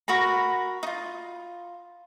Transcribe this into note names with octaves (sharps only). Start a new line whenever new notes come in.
F#4 A#4 A#5 B5
D#4 F4